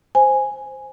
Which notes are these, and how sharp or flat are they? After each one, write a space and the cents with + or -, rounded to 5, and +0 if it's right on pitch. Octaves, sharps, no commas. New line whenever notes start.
C5 +0 G#5 -5